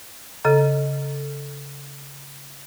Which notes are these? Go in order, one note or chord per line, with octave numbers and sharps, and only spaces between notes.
C#3 A4 D#5 A#5